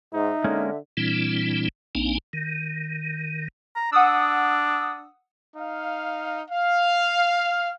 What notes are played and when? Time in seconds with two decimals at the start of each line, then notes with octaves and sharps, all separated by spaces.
0.14 G#2 D#4 E5
0.44 D3 G#3 A#3 C#4
0.97 A#2 E3 G3 C4 D4 E4
1.95 A#1 A#3 C4 D4 D#4 G#5
2.33 D#3
3.76 A#5
3.92 D4 F#5 D#6 E6
5.56 D#4 F5
6.49 F5